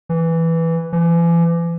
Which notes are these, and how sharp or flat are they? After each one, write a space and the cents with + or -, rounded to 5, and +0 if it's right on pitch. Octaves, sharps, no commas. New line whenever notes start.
E3 +0
E3 +40